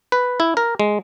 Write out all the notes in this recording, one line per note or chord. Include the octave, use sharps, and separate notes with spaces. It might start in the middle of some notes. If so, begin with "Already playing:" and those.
B4
E4
A#4
G#3